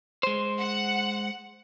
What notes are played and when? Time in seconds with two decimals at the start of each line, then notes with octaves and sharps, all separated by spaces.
0.23 G#3 C5
0.60 F#5